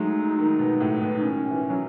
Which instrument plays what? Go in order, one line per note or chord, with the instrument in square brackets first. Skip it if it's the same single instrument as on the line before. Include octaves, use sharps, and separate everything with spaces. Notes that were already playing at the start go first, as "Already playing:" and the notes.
Already playing: [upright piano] F#3 G#3 A3 [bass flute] D#4
[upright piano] D#3
B2
A2
B2
[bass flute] D#4
[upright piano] D#3 [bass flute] C#4
[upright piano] E3
E3
F#3